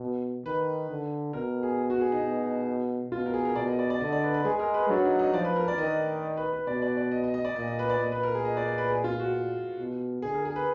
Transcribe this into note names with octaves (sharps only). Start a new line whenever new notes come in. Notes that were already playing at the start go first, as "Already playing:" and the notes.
Already playing: B2
D#3 B4
D3
B2 A#4
G#4
F#4
G#4
D#4
B2
B2 F4
A#4
G#4
A#4
B2 D5
D#5
D5
D5
D3 D#5
D5
B4
B4
G#3 G#4
A#4
B4
F#3 D4
D#4
D#4
F3 D5
B4
A#4
D5
D#3 D#5
B4
B4
B2 D5
D5
D5
D#5
D#5
D#5
D5
A#2 D#5
D#5
B4
D5
A#2 D#5
B4
A#4
G#4
D#5
D5
D5
B4
G#4
F4
F#4
B2
D3 G#4
A#4
G#4
B4